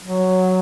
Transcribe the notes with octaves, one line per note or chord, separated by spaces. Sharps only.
F#3